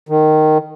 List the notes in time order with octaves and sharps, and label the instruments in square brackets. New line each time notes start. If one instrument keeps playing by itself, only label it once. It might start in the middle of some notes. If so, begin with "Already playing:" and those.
[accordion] D#3